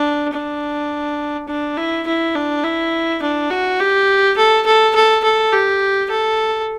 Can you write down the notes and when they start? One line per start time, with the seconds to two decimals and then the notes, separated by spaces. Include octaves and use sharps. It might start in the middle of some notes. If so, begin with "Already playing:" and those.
Already playing: D4
0.33 D4
1.49 D4
1.77 E4
2.07 E4
2.35 D4
2.64 E4
3.22 D4
3.50 F#4
3.80 G4
4.37 A4
4.66 A4
4.95 A4
5.24 A4
5.53 G4
6.11 A4